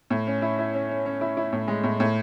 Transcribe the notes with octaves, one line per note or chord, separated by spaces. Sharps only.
A2
C#4
E4
E4
C#4
C#4
C#4
E4
E4
A2
G#3
A2
A2